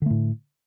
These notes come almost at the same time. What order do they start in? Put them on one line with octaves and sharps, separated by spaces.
D3 A3 A2